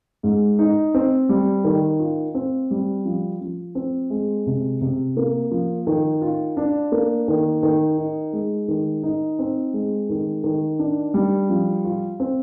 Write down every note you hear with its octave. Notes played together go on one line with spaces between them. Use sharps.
G#2
D#4
C4
G3
D#3
F4
C4
G3
F3
F3
C4
G#3
C3
C3
A#3
F3
D#3
F4
D4
A#3
D#3
D#3
D#4
G#3
D#3
D#4
C4
G#3
D#3
D#3
D4
G3
F3
F4
C4